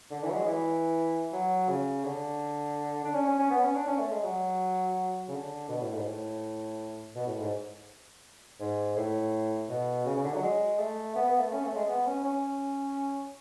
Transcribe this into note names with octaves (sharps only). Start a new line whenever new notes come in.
D3
E3
F#3
G#3
E3
F#3
C#3
D3
D4
C#4
C#4
C#4
B3
C#4
D4
C#4
A3
G#3
F#3
C#3
D3
B2
A2
G#2
A2
B2
A2
G#2
G#2
A2
B2
C#3
C#3
D3
F#3
G#3
A3
B3
B3
A3
C#4
A3
G#3
B3
C#4
C#4